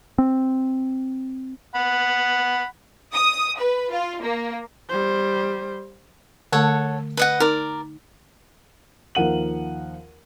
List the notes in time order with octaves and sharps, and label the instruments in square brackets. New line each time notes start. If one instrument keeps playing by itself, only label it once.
[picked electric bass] C4
[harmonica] F#5 B5
[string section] D#6
B4
F4
A#3
[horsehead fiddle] G3 C5
[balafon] D3 A3 [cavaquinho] A4 C#5 F#5
[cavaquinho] B4 D#5 F#5
[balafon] D#4 [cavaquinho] A#4 D5
[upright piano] D#2 F3 A#4 F#5 D#7 F#7